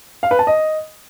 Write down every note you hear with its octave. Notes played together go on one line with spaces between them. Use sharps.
F5
B4
A5
D#5